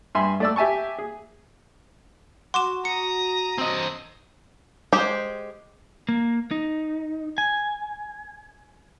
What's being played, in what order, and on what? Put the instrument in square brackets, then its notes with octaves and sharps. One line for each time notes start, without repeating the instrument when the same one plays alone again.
[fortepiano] G2 E5 G#5 C6
A3 D5 E6
G4 E5 G#5 A5 C#6
G#4
[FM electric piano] F#4 [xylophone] C6 D6 E7
[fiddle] A#5 D#6 [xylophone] C#7
[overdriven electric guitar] C4 D#5
[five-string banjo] G#3 G4 C5
[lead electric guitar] A#3
D#4
G#5